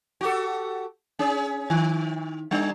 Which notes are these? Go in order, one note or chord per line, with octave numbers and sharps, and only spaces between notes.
F#4 G4 A4
C#4 G#4
D#3
G3 D4